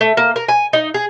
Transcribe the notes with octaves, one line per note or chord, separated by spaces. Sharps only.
A3
A#3
A#4
G#5
D#4
G#4